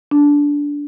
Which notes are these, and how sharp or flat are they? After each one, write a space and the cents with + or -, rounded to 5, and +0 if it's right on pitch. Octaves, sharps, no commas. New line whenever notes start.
D4 -15